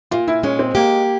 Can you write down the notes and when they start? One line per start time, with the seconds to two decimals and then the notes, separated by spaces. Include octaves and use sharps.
0.11 A#2 F4
0.28 E4
0.43 G#3 C#4
0.59 C4
0.75 A#3 G4